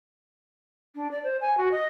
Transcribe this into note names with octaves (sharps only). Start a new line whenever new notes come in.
D4
D5
C5
G#5
F#4
D#5